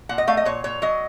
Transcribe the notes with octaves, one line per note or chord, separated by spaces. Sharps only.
A#2 F#5
D#5
A3 F5
D#5
A#2 C#5
A#2 C#5
F#3 D#5